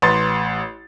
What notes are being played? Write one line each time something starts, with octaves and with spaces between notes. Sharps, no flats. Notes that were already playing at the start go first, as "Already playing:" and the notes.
A1 B4 C6 A6